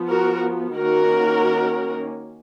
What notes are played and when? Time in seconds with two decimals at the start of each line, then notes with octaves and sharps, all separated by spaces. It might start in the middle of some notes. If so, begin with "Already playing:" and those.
Already playing: F3 B3
0.09 F#4 A#4
0.75 D#3 A#3 C#4 F#4 A#4